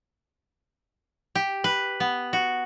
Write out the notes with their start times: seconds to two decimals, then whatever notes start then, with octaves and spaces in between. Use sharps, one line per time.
1.35 G4
1.64 B4
2.00 B3
2.33 F#4